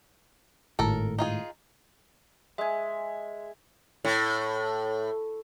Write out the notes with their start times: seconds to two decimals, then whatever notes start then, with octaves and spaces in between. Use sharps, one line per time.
0.79 G#1 A2 A4 A#4
1.19 D#4 F4 G#4
2.58 G#3 E5 G#5
4.05 A2